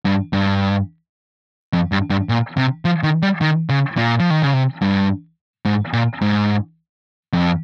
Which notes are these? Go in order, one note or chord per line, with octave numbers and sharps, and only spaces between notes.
G2
G2
F2
G2
G2
A#2
C3
F3
D#3
G3
D#3
C#3
A#2
F3
D#3
C#3
C3
G2
G#2
A#2
G#2
F2